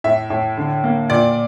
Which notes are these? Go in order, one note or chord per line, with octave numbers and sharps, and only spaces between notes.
A2 E5
A2
D3
A#3
A#2 D5